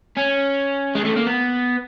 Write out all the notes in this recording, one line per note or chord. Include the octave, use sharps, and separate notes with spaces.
C#4
G#3
A3
A#3
B3